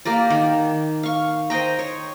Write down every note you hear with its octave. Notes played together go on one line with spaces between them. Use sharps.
A#3 G4 A#4 D5
D#3
F5 C#6
C5 D#5 G5 A#5
C#5